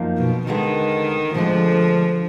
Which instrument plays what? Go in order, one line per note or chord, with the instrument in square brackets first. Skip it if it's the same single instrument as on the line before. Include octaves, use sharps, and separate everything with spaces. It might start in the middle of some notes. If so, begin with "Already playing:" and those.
Already playing: [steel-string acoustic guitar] F#2 F3 A#3 D#4
[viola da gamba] B2
[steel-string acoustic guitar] D#2 D3 G#3 B3 [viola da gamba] D#3
[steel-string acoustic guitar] D2 D3 G#3 D4 [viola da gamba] F3